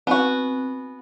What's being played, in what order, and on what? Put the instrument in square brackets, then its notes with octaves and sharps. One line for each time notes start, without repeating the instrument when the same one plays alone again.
[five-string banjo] B3 F#4 [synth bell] C4